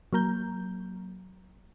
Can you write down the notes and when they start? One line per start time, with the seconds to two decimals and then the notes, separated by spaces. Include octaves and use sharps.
0.13 F#3 A#3 A#5 G6